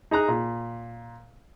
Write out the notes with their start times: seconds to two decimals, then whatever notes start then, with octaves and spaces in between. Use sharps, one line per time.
0.11 D#4 G#4 A#5 F#6
0.28 A#2